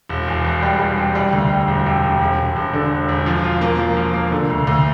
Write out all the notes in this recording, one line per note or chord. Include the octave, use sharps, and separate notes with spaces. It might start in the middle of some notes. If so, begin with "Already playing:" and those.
E1
E2
E2
G3
G3
C3
G3
D2
G3
E1
C3
C3
E1
E1
E1
D3
E1
E1
F3
F4
A#3
F3
F3
A#3
D3
D2
D2